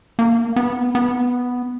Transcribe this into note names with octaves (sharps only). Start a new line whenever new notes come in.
A#3
B3
B3